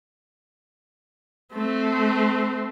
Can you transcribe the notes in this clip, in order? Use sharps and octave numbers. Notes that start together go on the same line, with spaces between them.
A3 C4